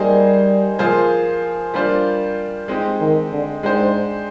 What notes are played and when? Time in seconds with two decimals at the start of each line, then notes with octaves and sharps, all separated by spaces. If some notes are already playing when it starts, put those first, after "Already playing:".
Already playing: G3 A#3 D#4 G#4 C5
0.79 F3 A#3 F4 G#4 C5
1.74 G3 A#3 D4 F4 C5
2.68 G#3 C4 D#4 G4
3.00 D#3
3.32 D3
3.63 G#2 G#3 D4 G4 C5